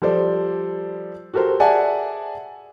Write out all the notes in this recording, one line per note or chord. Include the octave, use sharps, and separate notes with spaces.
F3 G3 A4 C5 D5
F#4 G4 A4 A#4 C5
G#4 D5 E5 F#5 G#5 A5